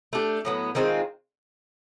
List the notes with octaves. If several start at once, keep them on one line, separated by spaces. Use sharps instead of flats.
A3 D4 G4
A2 F#3 B3
D#3 G#3 C4 F4